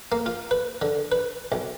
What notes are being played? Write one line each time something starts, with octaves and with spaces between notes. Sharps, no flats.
A#3
F4
B4
D3
B4
B1